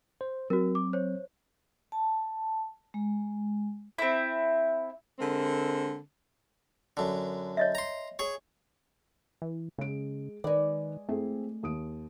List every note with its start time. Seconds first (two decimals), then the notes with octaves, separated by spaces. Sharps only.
0.21 C5
0.50 F#3 C4 F#4 A#4
0.75 D6
0.93 C5 C#5
1.92 A5
2.94 G#3
3.98 C4 E4
5.19 D3 G#3 C4 A#4
6.97 F#2 D3
7.57 C#5 D#5 E5
7.75 A#5 C6
8.19 G#4 C#5
9.42 E3
9.78 C#3 G#3 D7
10.44 D#3 G#3 B4 D5
11.09 A3 C4 E4 G#4
11.63 D#2 D#6 D7